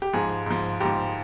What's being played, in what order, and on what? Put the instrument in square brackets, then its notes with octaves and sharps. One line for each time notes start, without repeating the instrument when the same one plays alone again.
[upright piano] G4
G#2 F3 G#4
G#2 F3
G#2 F3 G4